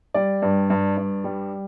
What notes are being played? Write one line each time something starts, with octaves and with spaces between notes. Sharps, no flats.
G3 D5
G2
G2
G2
G3